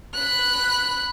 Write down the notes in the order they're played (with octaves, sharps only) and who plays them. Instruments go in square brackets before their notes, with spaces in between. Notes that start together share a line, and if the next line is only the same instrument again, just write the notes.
[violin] B5 F#6